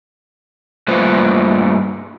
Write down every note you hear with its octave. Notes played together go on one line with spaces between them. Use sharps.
G2 A3 A#3 F4 B4 C5